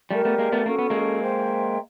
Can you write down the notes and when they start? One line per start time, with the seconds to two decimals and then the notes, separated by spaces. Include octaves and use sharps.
0.11 G3 A3 G4 A#4 D5
0.25 A3 B3
0.38 G#3 A#3
0.52 A3 B3
0.66 A#3 C#4 F#4 A4
0.79 B3
0.90 G#3 A#3
1.22 C5 E5 G5 C6